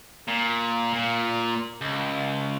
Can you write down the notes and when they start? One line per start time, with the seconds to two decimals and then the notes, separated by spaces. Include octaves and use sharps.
0.28 A#2
0.93 A#2
1.81 C#2